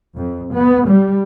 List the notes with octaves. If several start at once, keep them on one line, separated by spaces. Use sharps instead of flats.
F2
B3
G3